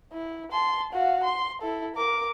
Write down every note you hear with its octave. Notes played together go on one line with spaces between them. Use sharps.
E4
A5 C6
F#4 F5
C6
E4 A4
A#4 D6